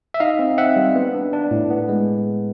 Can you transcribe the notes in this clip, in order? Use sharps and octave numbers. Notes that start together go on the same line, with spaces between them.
E5
D#4 D#5 F5
C4
C4 E5 F#5
G3
B3
D4
D4
A2
B3
G#3